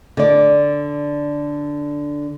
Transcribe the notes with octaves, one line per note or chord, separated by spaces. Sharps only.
D3 D5